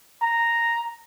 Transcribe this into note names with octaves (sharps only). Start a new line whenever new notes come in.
A#5